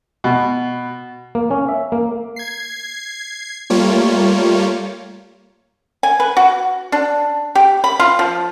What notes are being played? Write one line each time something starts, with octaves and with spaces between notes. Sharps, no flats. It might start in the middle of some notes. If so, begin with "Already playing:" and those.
B2
A#3
C#4
E5
A#3
G#6 C7
G3 A3 A#3 F4 C#5
G#5
B4
F#4
D4
G4
B5
F4
F3